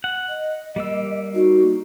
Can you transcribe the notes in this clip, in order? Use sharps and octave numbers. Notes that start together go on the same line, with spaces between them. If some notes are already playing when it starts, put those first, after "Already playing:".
F#5
D#5
G3 A#3 E6
D#4 F#4